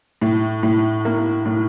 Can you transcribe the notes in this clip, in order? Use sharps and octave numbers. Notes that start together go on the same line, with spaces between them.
A2
A2
A#3
A2